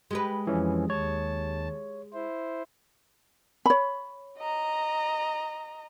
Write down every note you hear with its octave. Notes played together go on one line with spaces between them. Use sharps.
G#3 G4 B4
F2 E3 F3 C#4
D#2 C#5 A5
E4 C5
C#5 B5
D#5 A#5